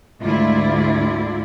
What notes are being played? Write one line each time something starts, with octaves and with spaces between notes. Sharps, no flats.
D2 G#2 D3 E4 F4 D5